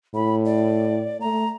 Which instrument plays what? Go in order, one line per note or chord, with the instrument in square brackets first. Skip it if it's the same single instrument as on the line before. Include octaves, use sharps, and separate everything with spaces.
[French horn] A2 [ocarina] B5
[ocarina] D5
[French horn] A3 [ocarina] A#5